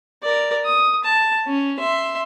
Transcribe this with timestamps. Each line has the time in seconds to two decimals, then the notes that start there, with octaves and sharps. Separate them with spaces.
0.23 A#4 D5
0.65 D#6
1.04 A5
1.47 C#4
1.79 E5 C6